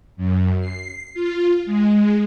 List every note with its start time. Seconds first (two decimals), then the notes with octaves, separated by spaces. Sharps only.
0.17 F#2
0.59 C7
1.14 F4
1.66 G#3